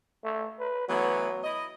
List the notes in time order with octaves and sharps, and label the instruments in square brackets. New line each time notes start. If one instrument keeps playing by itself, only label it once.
[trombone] A3
B4
[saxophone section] E3 A3 B3 [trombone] F#3
[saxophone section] E4 D#5